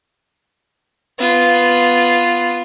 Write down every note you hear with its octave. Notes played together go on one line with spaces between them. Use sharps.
B3 F4